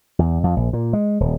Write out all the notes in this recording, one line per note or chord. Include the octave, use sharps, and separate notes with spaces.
E2
F2
A#1
A#2
G#3
D#1